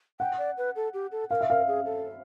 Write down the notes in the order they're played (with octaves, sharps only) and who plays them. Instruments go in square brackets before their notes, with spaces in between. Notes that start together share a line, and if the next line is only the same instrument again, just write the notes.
[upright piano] F#5 [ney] G5
[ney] D5
B4
A4
G4
A4
[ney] A#4 [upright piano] F5
[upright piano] E5
[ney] A#4 [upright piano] F5
[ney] G#4
A4